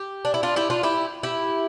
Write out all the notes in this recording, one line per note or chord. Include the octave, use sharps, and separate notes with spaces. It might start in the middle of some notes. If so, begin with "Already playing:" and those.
Already playing: G4
D4
E4
D4 F4
E4 G4
D4 F4
E4 G4
E4 G4